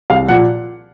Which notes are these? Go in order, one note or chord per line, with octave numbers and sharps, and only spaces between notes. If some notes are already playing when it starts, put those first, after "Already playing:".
C2 F5
A#2 F3 F#5